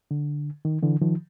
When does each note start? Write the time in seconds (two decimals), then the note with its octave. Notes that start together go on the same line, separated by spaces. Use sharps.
0.11 D3
0.65 D#3
0.83 D3 E3
1.02 D#3 F3